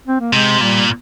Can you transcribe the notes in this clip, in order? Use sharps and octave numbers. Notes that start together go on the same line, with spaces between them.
C4
A#3
C3 G#3
A#2 G3